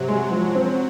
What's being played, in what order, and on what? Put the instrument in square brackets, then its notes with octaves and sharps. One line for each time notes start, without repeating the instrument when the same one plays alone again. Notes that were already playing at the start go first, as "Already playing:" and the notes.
Already playing: [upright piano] C3 [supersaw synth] F#3
[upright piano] G#3
F3
C4